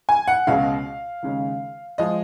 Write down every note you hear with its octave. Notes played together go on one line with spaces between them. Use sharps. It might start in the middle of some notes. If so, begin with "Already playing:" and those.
G#5
F#5
C#2 B2 G#3 C#4 F5
D#2 C#3 G#3 C#4
F3 G#3 D#5